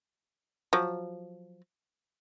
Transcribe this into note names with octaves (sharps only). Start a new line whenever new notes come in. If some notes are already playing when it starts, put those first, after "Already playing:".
F3 F#3